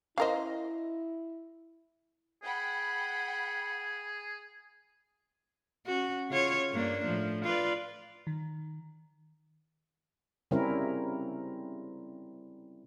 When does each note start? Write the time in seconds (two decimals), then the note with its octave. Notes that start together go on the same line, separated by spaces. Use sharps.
0.18 C#4 E4 A#4 C5 D#5 F5
2.43 G#4 F#5 G5 B5
5.86 C#4 F#4
6.30 C#3 F4 C#5
6.71 G2 A#3 D4
7.05 A2 F3
7.44 F4 B4 D5
8.27 D#3
10.51 C#3 G3 C4 C#4 E4 A#4